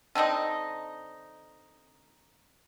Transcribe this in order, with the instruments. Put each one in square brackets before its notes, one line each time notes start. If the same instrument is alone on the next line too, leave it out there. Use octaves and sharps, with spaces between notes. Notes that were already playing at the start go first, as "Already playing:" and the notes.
[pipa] D3 C4 D4 D#4